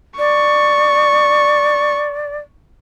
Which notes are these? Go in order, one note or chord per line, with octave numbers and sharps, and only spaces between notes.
D5 C#6